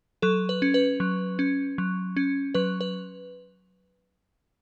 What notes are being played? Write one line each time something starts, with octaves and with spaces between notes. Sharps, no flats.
F#3 A4
B4
C#4
B4
F#3
C#4
F#3
C#4
F#3 B4
B4